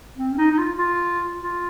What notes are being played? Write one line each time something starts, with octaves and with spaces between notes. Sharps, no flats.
C4
C#4
D#4
D#4
F4
F4
F4